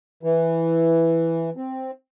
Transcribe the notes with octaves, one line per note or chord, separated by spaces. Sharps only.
E3
C4